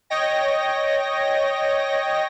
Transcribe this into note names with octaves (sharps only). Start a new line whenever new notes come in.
C#5 D#5 G5 A#6